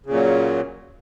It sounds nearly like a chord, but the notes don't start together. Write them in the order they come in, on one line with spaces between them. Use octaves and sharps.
C#3 A#2 F#3